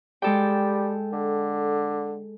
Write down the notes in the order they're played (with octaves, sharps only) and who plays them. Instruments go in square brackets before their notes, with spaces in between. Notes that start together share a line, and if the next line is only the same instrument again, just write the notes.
[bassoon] G3 [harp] G#3 A4 G5
[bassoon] D3